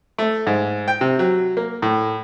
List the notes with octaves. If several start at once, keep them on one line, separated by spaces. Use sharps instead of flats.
A3
G#2
G5
C3
F#3
A#3
A2